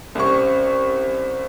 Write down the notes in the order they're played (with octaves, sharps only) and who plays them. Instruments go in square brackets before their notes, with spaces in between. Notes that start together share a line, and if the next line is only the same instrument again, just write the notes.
[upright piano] C2 C4 C#4 C#6